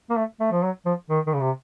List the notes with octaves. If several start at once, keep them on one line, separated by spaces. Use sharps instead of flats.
A#3
A3
A3
F3
F#3
F3
D#3
D#3
C#3
C3